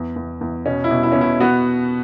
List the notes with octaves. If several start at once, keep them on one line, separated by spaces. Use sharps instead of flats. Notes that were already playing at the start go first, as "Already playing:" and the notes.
Already playing: E2
E2
E2
B2 C#4
E4
B2
E4
B2 C#4
E4
B3 F#4